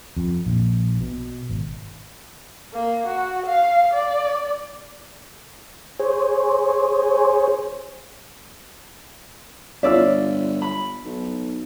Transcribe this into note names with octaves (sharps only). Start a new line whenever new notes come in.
F2
A#1
B2
G#1
A#3
F#4
F5
D5
G#4 C5 C#5
G1 F4 C#5 D5 E5 E6
B5
B1